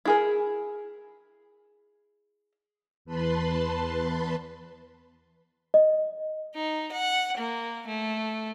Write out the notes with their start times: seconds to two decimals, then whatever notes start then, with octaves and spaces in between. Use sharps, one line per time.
0.05 E4 G#4 A#4
3.05 E2 B4 A5 B5 C6
5.74 D#5
6.55 D#4
6.92 F#5
7.37 A#3
7.87 A3